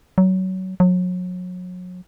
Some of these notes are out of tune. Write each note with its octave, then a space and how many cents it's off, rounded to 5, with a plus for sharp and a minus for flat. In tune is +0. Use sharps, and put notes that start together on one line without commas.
F#3 +20
F#3 -35